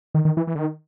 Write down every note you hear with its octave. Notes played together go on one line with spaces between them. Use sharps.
D#3
D#3
E3
E3
D3
D#3